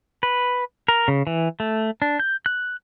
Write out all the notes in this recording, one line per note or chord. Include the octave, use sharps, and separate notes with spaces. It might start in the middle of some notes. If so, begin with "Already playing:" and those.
B4
A#4
C#3
E3
A3
D4
G6
F#6